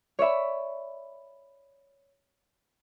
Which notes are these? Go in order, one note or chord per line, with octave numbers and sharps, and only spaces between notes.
C#5 D5 E5 B5